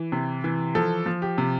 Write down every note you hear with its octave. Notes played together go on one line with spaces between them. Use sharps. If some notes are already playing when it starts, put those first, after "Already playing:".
Already playing: E3
C3
E3
F3 A4
F3
G4
C3